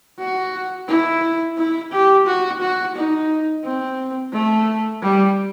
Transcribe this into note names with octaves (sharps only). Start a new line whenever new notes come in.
F#4
E4
E4
G4
F#4
F#4
D#4
C4
A3
G3